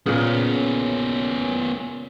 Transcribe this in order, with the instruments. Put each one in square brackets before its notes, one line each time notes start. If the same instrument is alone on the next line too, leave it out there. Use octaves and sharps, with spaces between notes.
[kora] A#2 C#3 [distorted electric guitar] B3 C#4